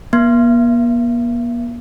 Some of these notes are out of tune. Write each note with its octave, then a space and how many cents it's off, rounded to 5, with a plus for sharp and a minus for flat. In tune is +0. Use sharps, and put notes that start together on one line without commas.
A#3 +45 E5 +45